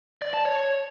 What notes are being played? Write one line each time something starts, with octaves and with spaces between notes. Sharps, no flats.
D5
A5
C#5